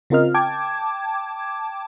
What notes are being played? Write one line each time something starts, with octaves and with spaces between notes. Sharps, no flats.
C#3 C4 F4 A#4 D#5 F6
G5 A5 D6 G#6